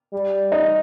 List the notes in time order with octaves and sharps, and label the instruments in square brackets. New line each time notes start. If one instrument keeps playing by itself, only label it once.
[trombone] G3
[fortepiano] D#4